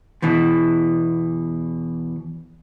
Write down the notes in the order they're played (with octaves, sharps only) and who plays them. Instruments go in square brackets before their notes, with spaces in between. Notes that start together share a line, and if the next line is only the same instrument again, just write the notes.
[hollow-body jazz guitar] E2 B2 E3